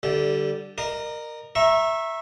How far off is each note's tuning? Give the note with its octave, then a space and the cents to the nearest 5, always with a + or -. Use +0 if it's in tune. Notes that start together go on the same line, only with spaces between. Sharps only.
D3 +0 G3 -15
A#4 +0 D#5 -45
E5 +0 A#5 +10 C#6 -30